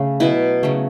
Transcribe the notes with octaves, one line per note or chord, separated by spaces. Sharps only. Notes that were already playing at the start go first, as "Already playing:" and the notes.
Already playing: C#3 A3
B2 F#3 B3 E4
C#3 F#3 A3